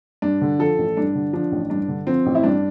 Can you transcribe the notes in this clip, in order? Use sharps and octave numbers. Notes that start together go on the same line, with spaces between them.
G2 D4
D3
F3 A4
A1
G2 D4
D3
F3 D4
A1
G2 D4
D3
F3 C4
A1
E4
G2 D4